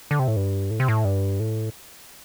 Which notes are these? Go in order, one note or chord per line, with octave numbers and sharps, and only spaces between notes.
D3
C3
A2
G2
A2
C3
A2
G2
A2